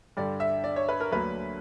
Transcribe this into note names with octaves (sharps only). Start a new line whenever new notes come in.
G2 D3 G3 D5
E5
D5
C#5
B4
A#4
D2 D3 F#3 A#3 B4